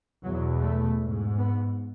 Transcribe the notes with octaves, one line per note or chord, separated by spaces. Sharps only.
E2 B2 F#3
A3
G#2
B3